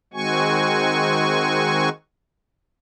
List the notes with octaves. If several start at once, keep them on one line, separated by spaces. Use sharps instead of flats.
D#3 G#3 C4 F#4 G#5 C#6